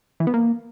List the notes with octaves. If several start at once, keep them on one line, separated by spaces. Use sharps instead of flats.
E3
B3
A#3